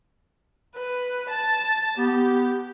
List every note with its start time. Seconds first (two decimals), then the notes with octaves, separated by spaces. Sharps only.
0.75 B4
1.29 A5
1.98 B3 G4